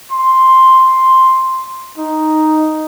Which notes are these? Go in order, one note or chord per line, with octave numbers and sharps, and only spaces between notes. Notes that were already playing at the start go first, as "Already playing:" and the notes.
C6
D#4